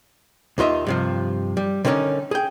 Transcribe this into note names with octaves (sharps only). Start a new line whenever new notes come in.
D#2 D#3 F4 D#5 E5
G2 C3 F3
G3
D3 D#3 G3 C4 C#4 D#4
G#4 G5